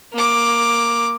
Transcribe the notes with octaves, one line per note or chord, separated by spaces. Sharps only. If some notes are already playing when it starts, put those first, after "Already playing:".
A#3 D6